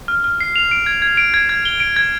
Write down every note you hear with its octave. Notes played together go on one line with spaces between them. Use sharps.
F6
F6
C7
F7
D7
G#6
G#6
D7
G#6
G#6
G7
D7
G#6